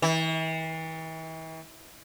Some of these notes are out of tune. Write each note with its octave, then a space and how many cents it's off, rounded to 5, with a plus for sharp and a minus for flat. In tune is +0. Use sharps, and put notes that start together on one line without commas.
E3 -40